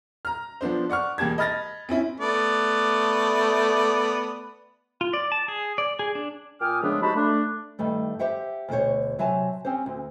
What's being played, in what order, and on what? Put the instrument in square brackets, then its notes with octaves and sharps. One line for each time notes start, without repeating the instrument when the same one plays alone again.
[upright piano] A#5 F6
F3 B3 D4 C5
D5 F#5 C#6 F6
E1 A#3 G4 A5 G#6
D#5 B5 F6 A6 A#6
C4 C#4 E4
[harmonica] A3 B3 D5
[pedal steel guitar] F4
D5
A5
G#4
D5
G#4
D4
[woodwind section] A#2 G5 G#5 D6 D#6 F6
C#3 F3 G#3 A3 B3 D4
D#4 F#4 G4 C5 A5 B5
A3 D4
[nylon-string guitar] G2 D#3 G3 A3
G4 C5 E5 F#5 G5
D2 B2 D4 C5 C#5
C3 F#3 E5 G#5 A5
C4 C#4 G4 C5
D2